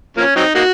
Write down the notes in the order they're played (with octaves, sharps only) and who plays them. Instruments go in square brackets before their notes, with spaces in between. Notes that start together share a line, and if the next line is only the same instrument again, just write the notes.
[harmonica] F3 A#3 C#4
F#3 C4 D#4
A#3 D#4 F#4